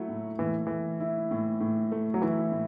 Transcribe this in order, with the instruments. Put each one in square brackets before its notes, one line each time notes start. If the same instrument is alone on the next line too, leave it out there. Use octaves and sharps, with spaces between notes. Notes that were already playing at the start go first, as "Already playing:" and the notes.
Already playing: [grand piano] F#3 [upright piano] A3 E4
[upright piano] A2
[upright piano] A2 [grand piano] E3
[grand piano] E3 [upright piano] A3
[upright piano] E4
A2
A2
A3
[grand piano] F#3
[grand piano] E3 [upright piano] E4
[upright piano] A2